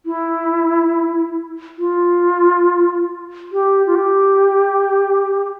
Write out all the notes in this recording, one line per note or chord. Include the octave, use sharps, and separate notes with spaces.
E4
F4
G4
F4
G4